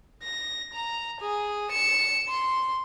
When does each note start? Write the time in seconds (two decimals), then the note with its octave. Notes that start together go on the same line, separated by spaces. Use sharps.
0.23 A#6
0.73 A#5
1.20 G#4
1.70 C#7 E7
2.29 C6